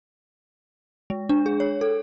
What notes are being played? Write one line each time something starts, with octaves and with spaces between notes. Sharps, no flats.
G#3
D4
G#4
C#5
A4